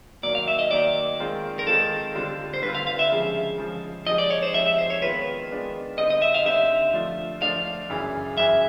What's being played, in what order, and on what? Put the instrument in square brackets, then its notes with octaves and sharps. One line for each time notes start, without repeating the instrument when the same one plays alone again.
[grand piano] D#3 F#3 A#3 D#4 [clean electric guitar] D5
[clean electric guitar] F5
E5
D#5
[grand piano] D#3 F#3 A#3 D#4 [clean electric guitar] D5
[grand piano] D#3 G#3 C4 F4
[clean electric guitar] A#4
[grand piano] D#3 G#3 C4 F4 [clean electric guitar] A4
[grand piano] D3 G3 C4 F4
[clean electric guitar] C5
[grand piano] D3 G3 C4 F4 [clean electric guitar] B4
[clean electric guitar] F5
F5
E5
[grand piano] C#3 F3 G#3
C#3 F3 G#3
[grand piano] F3 G#3 C4 D#4 G4 [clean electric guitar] D#5
[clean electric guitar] D5
C#5
C5
[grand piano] F3 G#3 C4 D#4 G4 [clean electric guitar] E5
[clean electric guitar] E5
C5
C#5
[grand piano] D#3 G#3 B3 D4 F4 [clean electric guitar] B4
[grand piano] D#3 G#3 B3 D4 F4
[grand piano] D3 G3 C4 D#4 [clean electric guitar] D#5
[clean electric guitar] D#5
E5
F5
[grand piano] D3 G3 C4 D#4 [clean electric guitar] E5
[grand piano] F3 A3 D4 F4
[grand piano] F3 A3 D4 F4 [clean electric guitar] F5
[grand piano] F#2 C#3 E3
[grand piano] F#2 C#3 E3 [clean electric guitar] E5